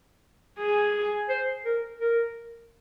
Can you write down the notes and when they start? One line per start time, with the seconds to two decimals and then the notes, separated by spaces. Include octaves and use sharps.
0.59 G#4
1.29 C5
1.65 A#4
2.00 A#4